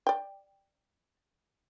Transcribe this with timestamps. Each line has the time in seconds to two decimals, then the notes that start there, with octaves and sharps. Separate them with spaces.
0.07 D5 G5